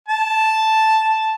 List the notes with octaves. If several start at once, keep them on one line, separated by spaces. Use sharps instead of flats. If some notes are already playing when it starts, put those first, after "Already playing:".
A5